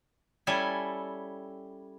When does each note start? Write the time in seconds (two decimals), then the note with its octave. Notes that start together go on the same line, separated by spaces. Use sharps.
0.47 G3 C#4 E4 A4 G#5